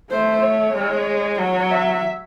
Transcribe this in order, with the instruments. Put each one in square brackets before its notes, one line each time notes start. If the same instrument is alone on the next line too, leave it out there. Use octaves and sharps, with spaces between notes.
[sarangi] A3 [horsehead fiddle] C5
[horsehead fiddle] C#5
[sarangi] G#3
[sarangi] F#3 [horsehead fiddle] C#5
[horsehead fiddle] E5